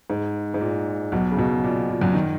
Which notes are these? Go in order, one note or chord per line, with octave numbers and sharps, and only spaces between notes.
G#2
G#2
A#2
B1 B2
C#3
B1 B2
A#2
A#2
F#2 F#3
D#3